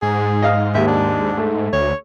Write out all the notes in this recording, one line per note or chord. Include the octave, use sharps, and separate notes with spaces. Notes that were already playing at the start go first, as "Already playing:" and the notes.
G#2 G#4
D#5 F5
D#2 E5
D4
A3
D2 C#5